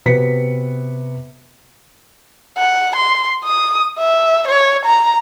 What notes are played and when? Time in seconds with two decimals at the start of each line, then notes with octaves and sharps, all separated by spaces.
0.06 C3 B3 F#4 B4 B6 C#7
2.58 F#5
2.96 C6
3.44 D#6
3.99 E5
4.48 C#5
4.85 A#5